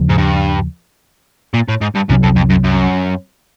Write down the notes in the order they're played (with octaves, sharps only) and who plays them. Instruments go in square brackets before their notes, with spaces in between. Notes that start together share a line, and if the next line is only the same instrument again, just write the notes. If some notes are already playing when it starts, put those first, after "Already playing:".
Already playing: [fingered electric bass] D#2 C#3 F3
[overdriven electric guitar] G#2
G2
A#2
A2
G#2
G2
[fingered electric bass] C2 C3 D#3 F#3 [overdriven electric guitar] F#2
[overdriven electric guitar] F2
F2
F#2
F#2